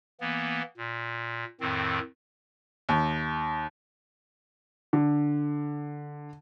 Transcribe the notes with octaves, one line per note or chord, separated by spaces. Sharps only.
E3 A#3 B3
A#2
F2 A2 D#3 C4
D#2
D3